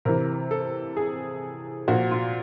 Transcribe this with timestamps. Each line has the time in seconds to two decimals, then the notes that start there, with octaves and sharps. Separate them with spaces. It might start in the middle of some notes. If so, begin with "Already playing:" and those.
0.05 C3 E3 A#4
0.51 A4
0.97 G#4
1.88 A#2 F3 F#4
2.11 F4